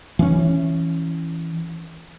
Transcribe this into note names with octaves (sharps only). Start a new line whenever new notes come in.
E3 C#4